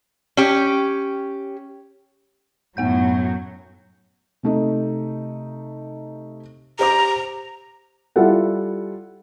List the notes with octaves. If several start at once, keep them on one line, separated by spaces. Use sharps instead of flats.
C#4 G4
F#2 A2 F#3 B3 F#5 G6
C3 A3 D#4
G4 C5 A#5 D6
G3 E4 F4 A4 F#5